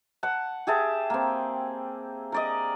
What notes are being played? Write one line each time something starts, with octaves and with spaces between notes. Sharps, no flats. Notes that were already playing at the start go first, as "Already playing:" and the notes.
F#5 A5
G4 G#4 E5 A5
A#3 C4
A#4 D5 D#5